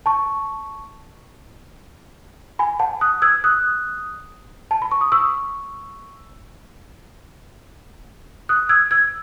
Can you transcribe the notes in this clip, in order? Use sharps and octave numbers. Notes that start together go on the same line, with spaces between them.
A5 C#6
G#5 B5
F#5 A5
D#6 F#6
E6 G#6
D#6 F#6
A5
B5
C#6
D#6
C#6 E6
D#6 F#6
E6 G#6
E6 G#6